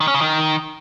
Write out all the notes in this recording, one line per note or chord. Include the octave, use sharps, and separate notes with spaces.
D#3
C#4
C#3
D#3